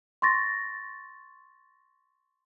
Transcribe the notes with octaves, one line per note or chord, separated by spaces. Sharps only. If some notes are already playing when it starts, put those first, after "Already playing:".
C6 C#6 A6 A#6